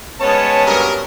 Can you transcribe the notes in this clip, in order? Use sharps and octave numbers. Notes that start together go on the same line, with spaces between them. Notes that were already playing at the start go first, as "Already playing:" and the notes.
G#3 B3 C#4 C#5 A5
G2 F#3 A#4